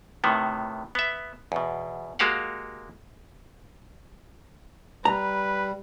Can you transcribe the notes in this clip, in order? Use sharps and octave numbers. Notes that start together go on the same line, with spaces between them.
A2 C3 D#3 B3
B3 E5
E2 B2
G#3 A#3 F#4 G4 F5 F#5
G3 B4 A#5